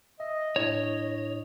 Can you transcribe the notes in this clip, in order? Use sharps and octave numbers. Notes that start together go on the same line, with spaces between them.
D#5 E5
A2 D4 E4 C#5